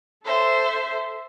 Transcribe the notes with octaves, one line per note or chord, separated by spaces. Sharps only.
A4 C5 E5